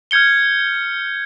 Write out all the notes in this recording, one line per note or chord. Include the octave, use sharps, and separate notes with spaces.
F6 G6 G#6 C#7 G7